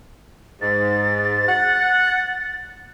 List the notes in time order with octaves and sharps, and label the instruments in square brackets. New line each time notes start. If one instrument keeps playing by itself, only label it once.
[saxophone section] G#2 [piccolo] A6
[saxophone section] F#5